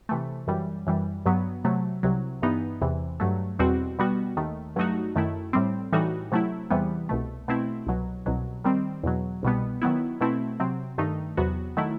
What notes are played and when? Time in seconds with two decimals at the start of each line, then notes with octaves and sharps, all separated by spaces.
0.09 C3 E3 A3
0.47 F#2 E3 G3
0.87 F#2 E3 G3
1.26 G2 F#3 B3
1.64 C3 F#3 A3
2.03 C2 C3 F#3
2.42 G2 E3 B3 D#4
2.81 E2 C3 E3
3.20 G2 F#3 A3
3.59 E2 B2 G3 C4 F#4
3.99 B2 G3 B3 F#4
4.37 D#2 D#3 A3
4.76 G2 F#3 A3 D#4 F#4
5.15 F#2 D#3 A3 E4
5.53 A2 G3 C4
5.93 A2 E3 G3 D#4 F#4
6.32 C3 F#3 A3 E4
6.70 E2 C3 E3 G3 B3
7.09 C2 B2 A3
7.48 B2 A3 C4 E4
7.87 C2 B2 F#3
8.26 C2 B2 F#3
8.64 D#3 G3 C4
9.03 E2 B2 F#3
9.43 C2 B2 G3 B3
9.82 D#3 F#3 B3 E4
10.21 B2 A3 C4 E4
10.60 C3 F#3 C4
10.98 G2 D#3 A3 D#4
11.37 E2 C3 F#3 B3 F#4
11.77 D#3 F#3 A3 E4